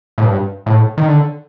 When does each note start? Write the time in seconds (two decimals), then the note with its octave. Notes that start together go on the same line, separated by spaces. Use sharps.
0.18 A2
0.24 G2
0.66 A2
0.98 D#3
1.08 D3